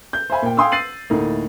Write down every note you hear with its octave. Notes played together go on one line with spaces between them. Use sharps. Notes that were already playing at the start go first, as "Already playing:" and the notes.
G6
C5 E5 F5 G#5 B5
A#2 G5
F5 G5 G#5 C6 D#6 E6
E6 A6 C7 D#7 F#7
D2 A2 A#3 D#4